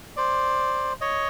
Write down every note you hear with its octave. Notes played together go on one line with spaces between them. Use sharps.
C5 D5
C#5 D#5